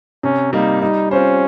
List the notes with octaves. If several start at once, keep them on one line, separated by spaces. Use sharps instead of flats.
C3 C#4
G3 A#3 D#4
G3 D#4
C4 C#4 F4 C5